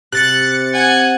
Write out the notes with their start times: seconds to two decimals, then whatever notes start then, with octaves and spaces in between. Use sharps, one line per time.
0.12 C3 F#6 A6 C#7
0.74 F#5 G#5